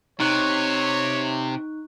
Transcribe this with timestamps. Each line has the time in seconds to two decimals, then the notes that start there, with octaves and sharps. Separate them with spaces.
0.20 C3 D#4 C#5 C#6 F#6